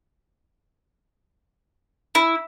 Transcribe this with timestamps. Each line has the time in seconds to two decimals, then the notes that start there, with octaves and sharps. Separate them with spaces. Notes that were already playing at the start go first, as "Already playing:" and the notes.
2.15 E4